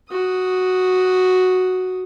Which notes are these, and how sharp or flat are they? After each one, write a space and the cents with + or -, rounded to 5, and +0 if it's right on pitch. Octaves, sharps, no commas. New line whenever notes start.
F#4 +0 D#6 +0